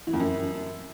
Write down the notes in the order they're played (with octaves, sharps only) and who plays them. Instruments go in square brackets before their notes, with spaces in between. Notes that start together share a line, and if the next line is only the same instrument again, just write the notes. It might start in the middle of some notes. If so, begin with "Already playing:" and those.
[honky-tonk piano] E3
F2
F#2